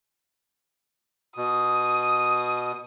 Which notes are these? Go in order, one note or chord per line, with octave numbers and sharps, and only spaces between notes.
B2 D#6